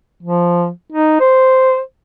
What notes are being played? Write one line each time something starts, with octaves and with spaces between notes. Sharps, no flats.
F3
D#4
C5